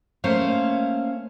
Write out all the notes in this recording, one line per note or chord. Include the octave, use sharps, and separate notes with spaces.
A3 A#3 C#4 C5 F5